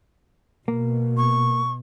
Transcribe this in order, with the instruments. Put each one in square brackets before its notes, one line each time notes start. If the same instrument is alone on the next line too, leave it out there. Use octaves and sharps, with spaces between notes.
[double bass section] B2 [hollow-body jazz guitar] A#3
[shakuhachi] C#6